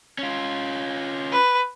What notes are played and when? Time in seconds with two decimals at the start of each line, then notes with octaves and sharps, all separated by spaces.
0.19 C#4 F4
1.32 B4